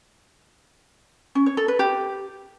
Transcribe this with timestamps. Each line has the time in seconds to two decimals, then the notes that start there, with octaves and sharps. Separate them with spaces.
1.35 C#4
1.46 C#5
1.57 A4
1.68 B4
1.79 G4